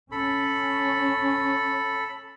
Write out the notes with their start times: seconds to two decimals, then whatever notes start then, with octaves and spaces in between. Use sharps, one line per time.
0.11 C#4 A4 B5